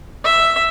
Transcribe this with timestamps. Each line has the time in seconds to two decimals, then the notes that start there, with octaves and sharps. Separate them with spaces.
0.24 E5